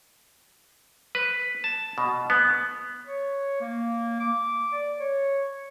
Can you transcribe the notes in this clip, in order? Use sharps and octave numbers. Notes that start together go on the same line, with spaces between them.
B4
A5
B2
B3
C#5
A#3
D6
D5
C#5